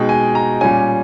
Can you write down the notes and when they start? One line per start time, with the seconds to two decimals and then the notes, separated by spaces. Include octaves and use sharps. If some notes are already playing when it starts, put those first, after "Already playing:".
Already playing: B2 G#3 D#4 G5
0.09 G#5
0.35 A#5
0.61 A#2 G3 C#4 G#5